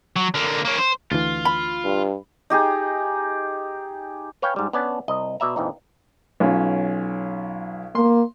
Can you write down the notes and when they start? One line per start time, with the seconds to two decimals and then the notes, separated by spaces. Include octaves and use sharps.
0.16 F#3
0.34 D3 A#3
0.65 A#3 C#4
0.79 C5
1.12 D2 E3 F4
1.45 B5
1.85 G2
2.50 D#4 G4 G#4
4.42 B4 C#5 F5 G5 G#5
4.56 G#2 G3
4.73 B3 C#4 D4 D5 G#5 A5
5.08 C2 D#5
5.40 B2 D5 E5 A#5
5.56 A#1 F2 E3 D#4
6.40 B1 C#4 F4
7.95 A#3 C6